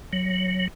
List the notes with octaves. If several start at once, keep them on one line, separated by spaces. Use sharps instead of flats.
F#3